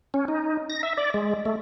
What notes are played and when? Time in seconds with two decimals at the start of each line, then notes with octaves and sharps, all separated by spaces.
0.14 C#4
0.28 D#4
0.70 A#6
0.83 E5
0.97 D5
1.14 G#3
1.45 A3